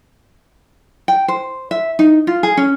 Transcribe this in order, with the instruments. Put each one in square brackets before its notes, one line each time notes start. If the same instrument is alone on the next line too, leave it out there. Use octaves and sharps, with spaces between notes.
[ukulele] G5
C5
E5
D#4
F4
G#4
C#4